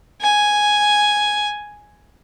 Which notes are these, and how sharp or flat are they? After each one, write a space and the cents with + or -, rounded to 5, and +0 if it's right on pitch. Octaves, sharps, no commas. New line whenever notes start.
G#5 +0